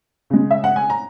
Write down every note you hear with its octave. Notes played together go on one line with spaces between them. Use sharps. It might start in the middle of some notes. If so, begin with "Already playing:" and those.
C#3 G#3
E5
F#5
G#5
A#5